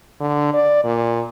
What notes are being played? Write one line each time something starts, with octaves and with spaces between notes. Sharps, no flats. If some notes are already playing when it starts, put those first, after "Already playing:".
D3
D5
A#2